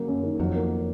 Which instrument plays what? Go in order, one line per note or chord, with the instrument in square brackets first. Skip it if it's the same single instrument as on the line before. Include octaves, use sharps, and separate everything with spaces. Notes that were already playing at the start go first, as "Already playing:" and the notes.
Already playing: [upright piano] C#3 F#3 A#3
F#2
D#3
[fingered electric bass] F2 [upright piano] F#3
[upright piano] A#3